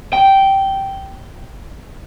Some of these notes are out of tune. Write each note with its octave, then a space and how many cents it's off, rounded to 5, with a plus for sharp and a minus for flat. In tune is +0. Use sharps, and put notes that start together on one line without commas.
G5 -10